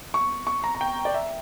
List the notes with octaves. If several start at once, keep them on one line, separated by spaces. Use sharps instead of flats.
C#6
C#6
A#5
A#5
G5
D5
E5